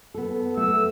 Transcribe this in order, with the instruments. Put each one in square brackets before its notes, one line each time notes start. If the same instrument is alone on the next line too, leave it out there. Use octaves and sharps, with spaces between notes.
[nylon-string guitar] B3 A4
[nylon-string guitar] A3 [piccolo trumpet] E6